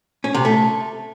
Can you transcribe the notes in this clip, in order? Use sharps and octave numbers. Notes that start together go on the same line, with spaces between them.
C#4
C3
A3